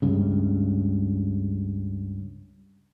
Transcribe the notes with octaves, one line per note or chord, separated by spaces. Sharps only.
C#2 G2 C#3